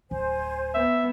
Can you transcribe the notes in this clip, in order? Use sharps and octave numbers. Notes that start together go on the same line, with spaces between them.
D1 D4 C5 G#5
B3 E5